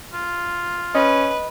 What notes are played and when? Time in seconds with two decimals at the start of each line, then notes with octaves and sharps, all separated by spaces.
0.13 F4
0.95 C#4 B4 D#5